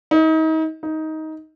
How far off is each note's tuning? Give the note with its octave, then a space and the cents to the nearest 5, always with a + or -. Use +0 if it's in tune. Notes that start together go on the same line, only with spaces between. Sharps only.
D#4 +35
D#4 +15